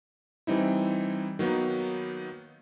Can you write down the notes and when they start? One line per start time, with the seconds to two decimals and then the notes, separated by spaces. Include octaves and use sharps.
0.47 E3 G3 C4 D#4 E4
1.39 D#3 F#3 A#3 B3 D#4